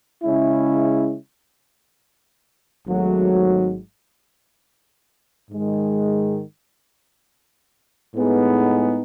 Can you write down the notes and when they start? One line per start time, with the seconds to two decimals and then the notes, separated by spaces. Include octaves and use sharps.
0.23 C#3 G#3 C#4 E4
2.86 G#1 G#2 F#3 A3
5.51 G#2 D#3 G#3
8.13 A2 G#3 B3 D#4 G#4